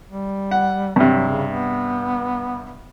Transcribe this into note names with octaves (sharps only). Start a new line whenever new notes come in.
G3
F#5
G2 C3 F#3
C#3
B3